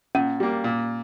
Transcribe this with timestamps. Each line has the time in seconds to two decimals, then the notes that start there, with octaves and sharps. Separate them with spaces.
0.15 A#2 C#4
0.40 G3 A#3
0.64 A#2